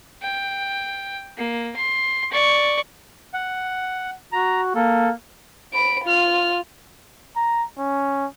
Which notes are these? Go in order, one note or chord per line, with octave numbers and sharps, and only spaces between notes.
G5
A#3
C6
D5 C#6
F#5
F#4 A#5
A#3 A4
B5 D7
F4 F6
A#5
C#4